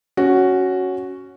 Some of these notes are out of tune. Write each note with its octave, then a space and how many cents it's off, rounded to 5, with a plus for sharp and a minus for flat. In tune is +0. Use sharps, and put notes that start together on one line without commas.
C#4 +0 F#4 +5